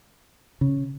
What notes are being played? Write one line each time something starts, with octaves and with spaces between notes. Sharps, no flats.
C#3